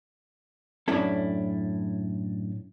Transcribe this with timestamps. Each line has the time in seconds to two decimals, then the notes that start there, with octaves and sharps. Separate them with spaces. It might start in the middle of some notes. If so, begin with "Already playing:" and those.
0.88 F#2 A2 C#4 D4 E4 A4